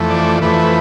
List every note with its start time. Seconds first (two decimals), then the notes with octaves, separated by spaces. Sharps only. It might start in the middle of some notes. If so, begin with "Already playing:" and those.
Already playing: F2 E3 A3
0.10 D5
0.42 F2 E3 A3 B4